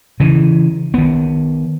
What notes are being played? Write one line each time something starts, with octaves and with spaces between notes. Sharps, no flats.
C#3 E3
D#3 B3